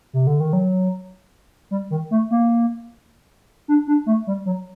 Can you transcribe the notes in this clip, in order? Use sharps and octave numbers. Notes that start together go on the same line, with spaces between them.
C3
D3
D#3
F#3
G3
D#3
A3
A#3
D4
D4
A3
G3
F#3